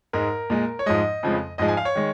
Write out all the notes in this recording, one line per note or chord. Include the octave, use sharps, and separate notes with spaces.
G#2 G#3 A#4
A#2 G#3
C#5
G#2 F3 G#3 D#5
F2 C#3 F3 G#3
G#2 F3 G#3 D#5
G#5
F5
C#5
D#3 G#3